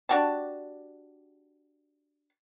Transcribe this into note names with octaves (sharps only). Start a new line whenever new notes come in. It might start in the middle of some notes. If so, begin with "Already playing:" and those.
D4 F#4 G4 A5